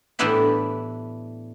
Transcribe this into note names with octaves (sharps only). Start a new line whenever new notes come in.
A2 E3 B3 D4 E4 G4